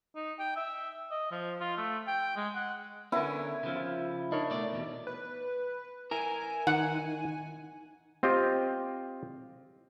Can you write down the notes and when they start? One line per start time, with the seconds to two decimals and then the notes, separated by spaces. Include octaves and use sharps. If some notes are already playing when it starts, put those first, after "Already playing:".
0.15 D#4
0.39 G5
0.56 E5
1.11 D#5
1.32 F3
1.60 F4
1.77 A3
2.07 G5
2.36 G#3
2.55 F#5
3.12 D3 B3 C#4 E4 A#4
3.63 C#3 F3
3.76 F4
4.32 D4 D#4 A#4 C#5
4.50 B2 A3 D5
4.73 E2 B2
5.07 B4
6.11 E4 A#4 G#5
6.67 D#3 F#5
8.23 C4 F4 G4 D#5